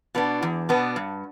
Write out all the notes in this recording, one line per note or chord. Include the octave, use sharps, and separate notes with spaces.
B2 B3 D4
E2
B2 B3 D4
G2